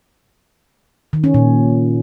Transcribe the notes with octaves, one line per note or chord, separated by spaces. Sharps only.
D#3
C#4
A#2